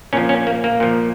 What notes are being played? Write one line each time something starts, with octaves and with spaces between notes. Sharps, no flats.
A#2 F3 C#4
C#4
A#3
A#3
A#2 F3